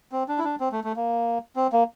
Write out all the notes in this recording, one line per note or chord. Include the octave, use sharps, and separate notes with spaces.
C4
D4
E4
D4
C4
A3
A3
A#3
C4
A#3